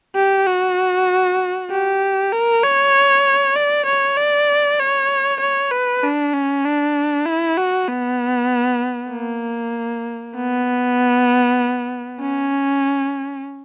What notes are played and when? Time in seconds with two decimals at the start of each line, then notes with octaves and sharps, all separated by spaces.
0.16 G4
0.47 F#4
1.70 G4
2.32 A#4
2.63 C#5
3.56 D5
3.86 C#5
4.17 D5
4.79 C#5
5.40 C#5
5.71 B4
6.03 D4
6.33 C#4
6.65 D4
7.26 E4
7.57 F#4
7.88 B3
9.11 A#3
10.35 B3
12.21 C#4